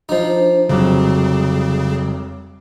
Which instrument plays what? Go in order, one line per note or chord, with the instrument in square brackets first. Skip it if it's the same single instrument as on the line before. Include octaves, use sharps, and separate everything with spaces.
[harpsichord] F3 D#4 [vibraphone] D4 C5
[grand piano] F1 F#3 [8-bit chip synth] C#3 [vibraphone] G3 C#5 D6